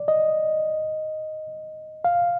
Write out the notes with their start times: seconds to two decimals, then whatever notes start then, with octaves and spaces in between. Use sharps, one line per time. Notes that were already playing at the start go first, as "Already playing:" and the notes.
Already playing: D5
0.08 D#5
2.05 F5